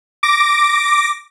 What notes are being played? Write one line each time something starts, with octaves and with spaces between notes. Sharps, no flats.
D6 A#6